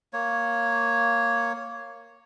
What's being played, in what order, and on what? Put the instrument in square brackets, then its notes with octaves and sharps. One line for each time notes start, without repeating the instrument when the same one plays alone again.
[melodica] A#3 C#5